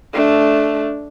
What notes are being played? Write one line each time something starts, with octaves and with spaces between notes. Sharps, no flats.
A3 D4